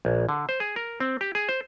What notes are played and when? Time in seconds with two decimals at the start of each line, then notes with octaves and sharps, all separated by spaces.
0.05 A#1
0.29 D3
0.49 C5
0.60 G#4
0.76 A#4
1.00 C4
1.21 G4
1.35 G#4
1.49 C5